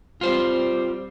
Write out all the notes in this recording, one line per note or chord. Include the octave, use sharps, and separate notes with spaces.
G3 C4 F4 C5